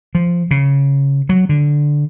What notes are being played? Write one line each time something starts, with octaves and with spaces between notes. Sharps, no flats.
F3
C#3
F#3
D3